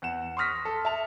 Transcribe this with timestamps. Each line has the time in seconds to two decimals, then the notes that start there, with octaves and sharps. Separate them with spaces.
0.02 E2 F#5 E7
0.37 C6 C#6 D#6 F6 A#6 B6
0.65 A4
0.85 E5 A5 F7